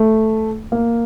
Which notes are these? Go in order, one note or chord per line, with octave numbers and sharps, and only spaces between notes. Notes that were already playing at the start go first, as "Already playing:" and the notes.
Already playing: A3
A#3